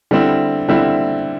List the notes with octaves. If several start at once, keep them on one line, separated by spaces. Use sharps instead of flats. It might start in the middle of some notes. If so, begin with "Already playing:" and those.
D3 G3 C4 E4
D3 G3 C4 E4